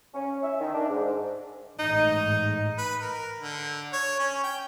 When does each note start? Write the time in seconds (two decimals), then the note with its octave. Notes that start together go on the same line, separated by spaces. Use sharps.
0.14 C#4
0.43 E5
0.60 D#3
0.73 D4
0.89 G#2
1.79 A1 G#2 D#4
2.78 B4
3.01 A#4
3.40 D3
3.93 C#5
4.19 C#4
4.43 G5